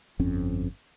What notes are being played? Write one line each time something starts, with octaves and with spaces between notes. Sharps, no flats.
G1 F2 C4 C#4